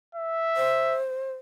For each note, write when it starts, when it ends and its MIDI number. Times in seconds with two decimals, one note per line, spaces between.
0.15 0.99 76
0.57 1.32 72